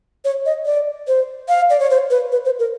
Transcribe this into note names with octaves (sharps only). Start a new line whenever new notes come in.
C#5
D#5
D5
C5
F5
D5
C#5
C5
B4
B4
C5
A#4